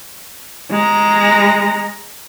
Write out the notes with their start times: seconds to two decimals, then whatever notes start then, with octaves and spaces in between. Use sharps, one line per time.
0.71 G#3 A#5